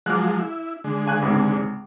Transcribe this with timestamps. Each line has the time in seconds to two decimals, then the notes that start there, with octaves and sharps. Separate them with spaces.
0.06 F3 F#3 G#3 D6 F6 F#6
0.40 E4
0.84 D3 G#3
1.06 C#3 G#5 F#6
1.22 C#2 G#2 C3